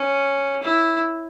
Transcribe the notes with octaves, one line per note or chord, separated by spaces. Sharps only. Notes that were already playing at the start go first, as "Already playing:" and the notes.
Already playing: C#4
E4